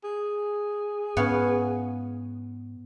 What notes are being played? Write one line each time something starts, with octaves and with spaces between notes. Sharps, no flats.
G#4
G#2 B3 C#4 C#5 F5